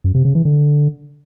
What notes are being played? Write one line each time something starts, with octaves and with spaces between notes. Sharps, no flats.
F#2
C3
C#3
E3
D3